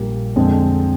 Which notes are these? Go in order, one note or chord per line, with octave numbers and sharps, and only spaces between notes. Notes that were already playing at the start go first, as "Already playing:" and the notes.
Already playing: A#1 A#2 G3 A#3
F2 D3 G#3 C4